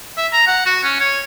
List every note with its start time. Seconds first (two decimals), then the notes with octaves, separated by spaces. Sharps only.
0.17 E5
0.33 A#5
0.47 F#5
0.66 F#4
0.84 C#4
1.00 C#5